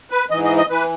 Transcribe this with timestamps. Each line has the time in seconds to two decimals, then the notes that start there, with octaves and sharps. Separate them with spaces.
0.11 B4
0.30 G#2 E3 D#5
0.44 D#5
0.57 D#5
0.69 E3 B4